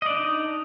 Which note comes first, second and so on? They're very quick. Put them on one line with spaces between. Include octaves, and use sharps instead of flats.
D#5 D5 D4 D#4